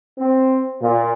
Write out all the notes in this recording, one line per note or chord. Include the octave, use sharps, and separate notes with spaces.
C4
A#2